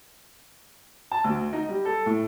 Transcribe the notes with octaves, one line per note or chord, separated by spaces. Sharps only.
A5
D2
D#4
G3
A4
A2